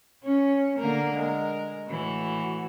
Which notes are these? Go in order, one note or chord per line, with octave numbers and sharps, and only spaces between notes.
C#4
D3 A#3 A#4
G#3 A#4
A2 E3 F#4